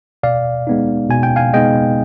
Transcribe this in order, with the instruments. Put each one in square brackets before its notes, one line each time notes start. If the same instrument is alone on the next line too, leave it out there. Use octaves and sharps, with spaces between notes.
[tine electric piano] B2 D5 F5
G#3 B3 D#4
B2 G#5
G5
F5 G#5
G#3 B3 D#4 D#5 G5